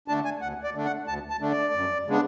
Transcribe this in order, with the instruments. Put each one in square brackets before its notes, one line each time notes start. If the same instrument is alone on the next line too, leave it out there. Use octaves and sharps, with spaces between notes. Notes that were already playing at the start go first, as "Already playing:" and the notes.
[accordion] D3 A3 D4 A5
G#5
D2 F#5
D5
D3 A3 D4
F#5
D2 A5
A5
D3 A3 D4
D5
F#2
C#3 G#3 B3 D4